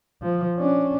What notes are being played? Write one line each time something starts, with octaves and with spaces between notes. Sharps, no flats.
F3
C#4 D4